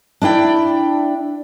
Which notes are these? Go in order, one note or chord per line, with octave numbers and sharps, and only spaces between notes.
D4 E4 D5 G5